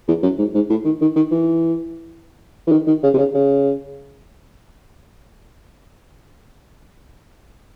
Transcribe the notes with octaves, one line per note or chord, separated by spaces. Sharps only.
E2
F#2
G#2
G#2
A2
D#3
D#3
D#3
E3
E3
D#3
D#3
C#3
C3
C#3
C#3